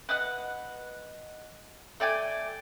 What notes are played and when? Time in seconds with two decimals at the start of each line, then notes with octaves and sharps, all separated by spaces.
0.09 B4 D#5 F#5
2.00 A3 D5 G5 G#5